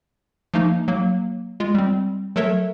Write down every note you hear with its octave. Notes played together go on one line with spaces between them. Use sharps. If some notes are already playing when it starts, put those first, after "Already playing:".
F3 A3 A#3 D#4
F#3 A#3
G#3 F4
G3 C4
F#3 A3 A4 A#4 C#5 E5